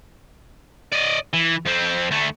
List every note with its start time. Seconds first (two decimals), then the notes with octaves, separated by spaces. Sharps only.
0.93 D5 D#5
1.33 E3
1.65 F2 C4
2.11 D2 A3